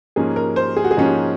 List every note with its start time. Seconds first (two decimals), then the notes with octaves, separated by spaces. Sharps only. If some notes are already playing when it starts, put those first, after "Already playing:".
0.16 G#2 F3 A#3 C#4 G#4
0.36 A#4
0.56 C5
0.77 G#4
0.85 F#4
0.91 G#4
0.97 G#2 F3 A#3 C#4